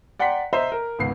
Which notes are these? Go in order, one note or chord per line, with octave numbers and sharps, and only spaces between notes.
D5 F#5 G5 A#5 C6 B6
C5 D#5 E5 A#5
A#4
G#1 C#2 B3 C7